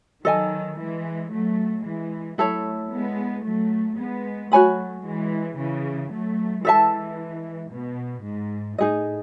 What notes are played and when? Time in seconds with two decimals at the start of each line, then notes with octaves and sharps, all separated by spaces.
0.25 D#3 F#3 A4 D#5 G#5
0.78 E3 G#3
1.32 F#3 A3
1.85 E3 G#3
2.38 F#3 A3 E4 A4 C#5
2.92 G#3 B3
3.45 F#3 A3
3.98 G#3 B3
4.52 F#3 A3 F#4 C#5 G#5 B5
5.05 E3 G#3
5.58 C#3 E3
6.11 F#3 A3
6.65 E3 G#3 A4 E5 A5
7.71 B2
8.24 G#2
8.78 A2 D#4 G#4 D#5